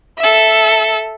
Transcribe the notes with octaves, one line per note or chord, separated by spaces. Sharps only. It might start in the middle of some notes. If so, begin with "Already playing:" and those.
A4 E5